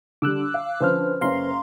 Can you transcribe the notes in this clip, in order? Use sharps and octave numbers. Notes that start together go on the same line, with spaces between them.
D3 G3 D6 E6 F#6
F5
D3 F3 C#4 B4 C5 F6
F#1 F#2 C#4 F5 A#5 C6